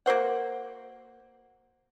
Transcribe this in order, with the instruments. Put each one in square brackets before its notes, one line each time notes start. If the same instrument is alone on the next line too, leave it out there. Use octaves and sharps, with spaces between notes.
[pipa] A#3 F#4 C5 F#5